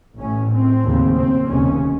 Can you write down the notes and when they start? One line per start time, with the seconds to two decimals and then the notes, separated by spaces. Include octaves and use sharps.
0.18 A1 A2 C#4
0.51 C4
0.83 F1 D#2 C#3
1.17 C4
1.49 F1 D#2 C#3 C#4